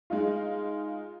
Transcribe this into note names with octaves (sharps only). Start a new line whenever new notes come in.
G#3 D#4 F4